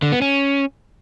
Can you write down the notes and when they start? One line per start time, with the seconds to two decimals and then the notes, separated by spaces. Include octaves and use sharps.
0.02 D3
0.12 B3
0.22 C#4